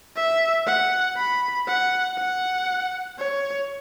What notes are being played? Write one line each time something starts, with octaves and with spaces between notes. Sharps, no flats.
E5
F#5
B5
F#5
F#5
C#5